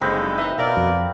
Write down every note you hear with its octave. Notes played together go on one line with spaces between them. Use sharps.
F#1 G2 D3 G#3 C4 D#4 B4
E3 D#4 E5
B2 A#4 D5 F5
F2